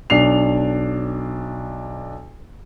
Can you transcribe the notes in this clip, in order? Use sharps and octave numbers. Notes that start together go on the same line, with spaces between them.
B1 D4 C7 F7